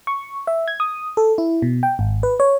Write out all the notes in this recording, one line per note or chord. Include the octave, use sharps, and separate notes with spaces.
C#6
E5
G#6
D#6
A4
E4
B2
G5
G#1
B4
C#5